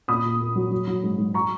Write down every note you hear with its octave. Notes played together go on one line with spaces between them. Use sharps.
A#2 B5 D#6
A#2
A#3
F#3
F#3
F#3
G#2
G#2
A#5 C#6